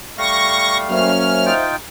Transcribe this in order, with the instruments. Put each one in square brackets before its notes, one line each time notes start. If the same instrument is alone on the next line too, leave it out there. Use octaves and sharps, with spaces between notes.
[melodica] G3 A3 F5 [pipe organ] C#6 A#6
[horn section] F#3 A#3 C#4 [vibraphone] C5 E5 [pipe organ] F6
[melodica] D#4 F4 G5